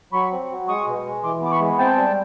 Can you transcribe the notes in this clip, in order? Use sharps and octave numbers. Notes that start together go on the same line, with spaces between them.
F#3 B5 C#6
C4
F#3
G#3 C#6 D#6
B2
G#3
E3 C6 D6
B3 D6
B5 C#6
G#3
C4 G5 A5
G3